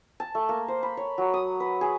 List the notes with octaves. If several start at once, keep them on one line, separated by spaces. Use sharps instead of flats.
A5
A3
A#3
C5
B5
C#5
F#3
D#6
B4
G#4